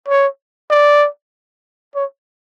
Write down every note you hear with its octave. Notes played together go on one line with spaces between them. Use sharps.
C#5
D5
C#5